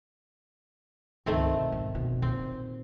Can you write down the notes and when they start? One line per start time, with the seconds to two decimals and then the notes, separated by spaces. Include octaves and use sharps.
1.26 G1 C#2 D#3 A3 C4
1.54 B2
1.72 G#2
1.95 F1 B2
2.22 A#2 C4